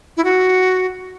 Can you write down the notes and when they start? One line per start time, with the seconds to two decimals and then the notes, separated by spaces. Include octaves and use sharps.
0.17 E4
0.24 F#4